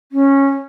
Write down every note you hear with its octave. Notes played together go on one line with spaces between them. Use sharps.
C#4